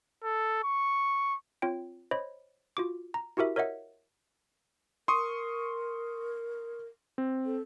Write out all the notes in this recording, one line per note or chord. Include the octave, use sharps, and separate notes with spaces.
A4
C#6
C4 F4 C#5 G5
C5 C#5 D#5 B5
F4 F#4 D6
A#5
E4 F#4 G4 A#4 E5
A#4 C#5 D#5 E5 F#5
A#4 C6 C#6 D#6
C4
A4